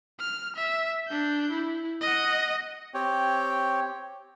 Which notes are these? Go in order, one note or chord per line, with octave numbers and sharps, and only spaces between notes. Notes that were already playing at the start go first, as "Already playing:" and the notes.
F6
E5
D4 G6
E4
D#5 F#5
C4 G4 C#5 G5